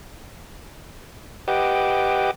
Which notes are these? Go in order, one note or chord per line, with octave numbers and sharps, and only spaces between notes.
G4 B4 D#5 F#5 G5 D6